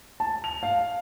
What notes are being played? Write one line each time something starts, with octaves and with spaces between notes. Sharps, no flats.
A5
F7
F5